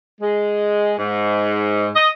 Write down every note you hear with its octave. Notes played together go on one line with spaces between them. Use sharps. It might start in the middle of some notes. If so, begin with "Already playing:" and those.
G#3
G#2
D#5